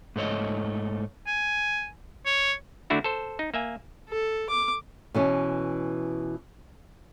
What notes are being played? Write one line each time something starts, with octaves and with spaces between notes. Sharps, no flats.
G#2 A3 C#5 D#5
G#5
C#5
D3 A3 D4 E4 F#4
A4 C5
D#4
A#3 E5 G#5
A4
D6
B2 E3 C#4